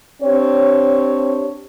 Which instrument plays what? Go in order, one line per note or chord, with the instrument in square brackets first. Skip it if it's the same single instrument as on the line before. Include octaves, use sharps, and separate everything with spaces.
[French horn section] C4 D4 G4 C#5